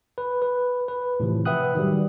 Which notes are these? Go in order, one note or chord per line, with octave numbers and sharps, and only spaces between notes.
B4
B4
B4
A2 C3 E3 F3
B4 E5 F#5 G5 D#6 F#6
D#3 F#3 G3